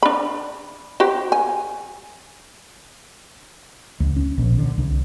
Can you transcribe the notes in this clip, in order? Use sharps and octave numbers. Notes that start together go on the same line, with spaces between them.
D4 B5
F#4 G4 C5
G#5
C#2
C#4
A#1
D3
C2